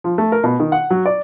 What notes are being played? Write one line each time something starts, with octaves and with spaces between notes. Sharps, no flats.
F3
A3
A#4
B2
D#3
F#5
F#3
D5